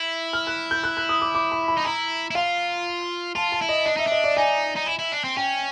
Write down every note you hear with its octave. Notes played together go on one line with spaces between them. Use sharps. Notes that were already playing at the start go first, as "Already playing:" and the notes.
Already playing: E4
F6
F#6
G6
F#6
F#6
D#6
D6
D6
B5
B5
D#4
E4 A#5
E4
F4 F5
F4 A5
A5
E4
D#5
D4 D#5
D#4 E5
D4
D#5
D5
D#4 G#5
D#4
E4
E4
D4
C4
C#4 G5